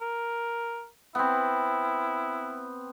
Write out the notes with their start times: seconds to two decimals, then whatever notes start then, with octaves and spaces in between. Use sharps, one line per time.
0.01 A#4
1.15 B3 C4 E4